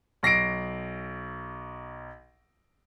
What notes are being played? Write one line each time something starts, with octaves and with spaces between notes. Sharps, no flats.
B1 A#6 C7 D7